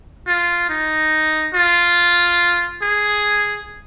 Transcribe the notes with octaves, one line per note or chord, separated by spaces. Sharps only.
F4
D#4
F4
G#4